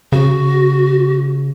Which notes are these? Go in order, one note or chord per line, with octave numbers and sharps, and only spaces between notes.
C#3 F#4